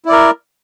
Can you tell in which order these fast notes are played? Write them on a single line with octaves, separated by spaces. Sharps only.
E4 D5 A#4